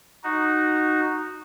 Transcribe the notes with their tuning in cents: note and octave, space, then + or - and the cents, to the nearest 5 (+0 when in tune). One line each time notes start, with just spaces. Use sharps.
D#4 -10 F#4 +0